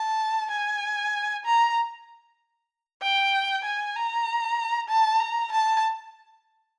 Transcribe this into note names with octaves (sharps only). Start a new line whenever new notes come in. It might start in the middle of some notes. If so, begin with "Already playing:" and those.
Already playing: A5
G#5
A#5
G5
G#5
A#5
A5
A#5
A5